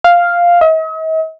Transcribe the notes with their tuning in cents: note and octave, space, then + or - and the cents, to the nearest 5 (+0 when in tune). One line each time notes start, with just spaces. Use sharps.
F5 +0
D#5 +45